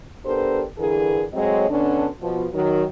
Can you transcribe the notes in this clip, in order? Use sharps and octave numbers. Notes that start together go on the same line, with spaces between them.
B3 D4 G4 A4 A#4 C5
G2 D3 E3 G#4 A#4
A2 F#3 G#3 C4 C#5 D#5
B2 D3 C#4 D4
B2 F3
D#3 F#3